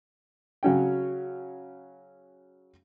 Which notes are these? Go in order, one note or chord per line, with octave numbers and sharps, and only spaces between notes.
C#3 F#3 C#4 G5